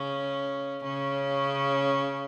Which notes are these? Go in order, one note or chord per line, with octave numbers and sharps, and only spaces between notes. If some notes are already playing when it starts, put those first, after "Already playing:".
Already playing: C#3 C#4
C#3 C#4